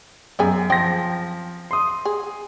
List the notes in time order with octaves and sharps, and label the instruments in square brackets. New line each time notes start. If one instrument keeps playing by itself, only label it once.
[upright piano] F#2 [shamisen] B3 G#4 G#5
[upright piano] F3 A#6 [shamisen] C4 C5 G5
[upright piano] C6 D#6
[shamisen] G#4